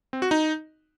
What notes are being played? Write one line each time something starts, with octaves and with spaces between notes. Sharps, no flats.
C4
F#4
D#4